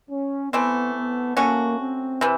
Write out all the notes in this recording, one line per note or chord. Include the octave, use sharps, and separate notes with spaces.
C#4
E3 A3 B3 C4
B3
A3 A#3 C#4 F#4
C4
C3 E3